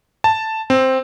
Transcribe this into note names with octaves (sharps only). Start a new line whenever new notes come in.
A5
C4